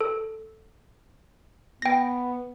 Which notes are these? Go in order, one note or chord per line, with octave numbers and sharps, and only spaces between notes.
A4
B3 G5 A#6